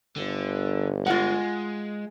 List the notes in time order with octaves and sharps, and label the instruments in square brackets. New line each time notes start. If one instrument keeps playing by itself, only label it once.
[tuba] G1 [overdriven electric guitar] D3
[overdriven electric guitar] G#3 [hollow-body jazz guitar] F4 F#5